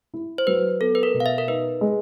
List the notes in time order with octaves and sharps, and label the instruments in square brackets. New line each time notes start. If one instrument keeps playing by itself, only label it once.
[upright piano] E4
[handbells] C5
[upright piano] F#3 [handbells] B4
[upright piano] B3 [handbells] A4
[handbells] B4
A#4
[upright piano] B2
[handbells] F5
E5
A#4
[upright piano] D#4 [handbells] B4
[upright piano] G#3